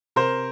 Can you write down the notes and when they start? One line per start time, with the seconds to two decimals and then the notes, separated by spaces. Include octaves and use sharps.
0.16 C3 A#4 C5